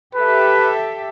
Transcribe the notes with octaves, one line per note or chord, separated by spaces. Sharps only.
G4 A4 B4 E5